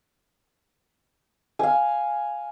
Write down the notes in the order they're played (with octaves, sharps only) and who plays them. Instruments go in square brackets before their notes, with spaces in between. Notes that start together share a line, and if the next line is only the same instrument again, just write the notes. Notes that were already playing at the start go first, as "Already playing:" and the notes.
[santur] F5 G#5